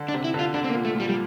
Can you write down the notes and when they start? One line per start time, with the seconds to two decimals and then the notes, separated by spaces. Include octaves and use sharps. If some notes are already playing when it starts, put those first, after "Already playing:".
Already playing: D3
0.08 D4
0.14 C3
0.24 E4
0.34 D3
0.39 F4
0.54 D3 D4
0.64 C4
0.70 A#3
0.75 A#2
0.85 A3
0.95 A#2 G3
1.09 G3